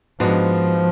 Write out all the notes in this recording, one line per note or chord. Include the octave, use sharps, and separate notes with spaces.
G#2 F3 G#3 B3 D4 F#4